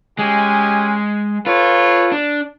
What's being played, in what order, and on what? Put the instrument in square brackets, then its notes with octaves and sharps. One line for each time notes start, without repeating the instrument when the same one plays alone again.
[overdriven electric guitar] G#3 [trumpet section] C#4 G4 G#5
[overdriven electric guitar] F4 [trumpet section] A4 B4 C#5
[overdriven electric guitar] D4